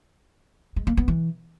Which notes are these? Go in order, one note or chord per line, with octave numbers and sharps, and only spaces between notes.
G#3
A#3
B3
E3